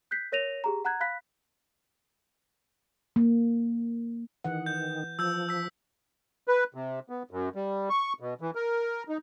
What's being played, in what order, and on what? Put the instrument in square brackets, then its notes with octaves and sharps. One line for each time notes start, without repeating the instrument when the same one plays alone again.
[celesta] F#6 G6 B6 C7
A#4 C#5 A#6 D#7 F7
G4 G#4 A#5
F#5 A#5 F#6 G#6
F5 B5 F#6 B6
[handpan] A#3
[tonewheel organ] D#3 [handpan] E3 F#5
[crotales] G6
[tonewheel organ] F3 [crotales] E6 G6
[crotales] E6 B6
[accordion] B4
C3
B3
F#2
G3
C#6
B2
E3
A#4
D#4